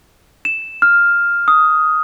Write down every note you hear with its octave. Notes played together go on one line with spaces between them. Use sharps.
E7
F6
D#6